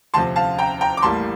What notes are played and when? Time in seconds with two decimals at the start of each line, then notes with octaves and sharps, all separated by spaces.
0.14 D2 C3 F3 A5 C6
0.36 F5 A5
0.58 G5 A#5
0.81 G5 A#5
0.97 D6
1.02 A1 A2 G3 A#3 A5 C6